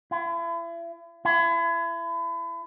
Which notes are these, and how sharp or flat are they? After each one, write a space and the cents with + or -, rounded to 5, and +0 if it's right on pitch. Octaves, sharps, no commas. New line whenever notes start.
E4 +40
E4 +35